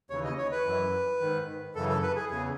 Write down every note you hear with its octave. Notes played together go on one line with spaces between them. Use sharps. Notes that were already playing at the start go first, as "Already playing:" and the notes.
D#2 C#3 E3 C#5
D#5
C#5
B4
F#2 E3
G#2 D#3
F#2 C#3 E3 A4
A4
B4
G#4
E2 C#3 E3 G#4